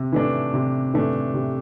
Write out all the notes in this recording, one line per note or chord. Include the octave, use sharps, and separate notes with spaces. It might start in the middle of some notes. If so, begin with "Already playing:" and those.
Already playing: C3
E3 A3 D4
C3
E3 A3 D4
C3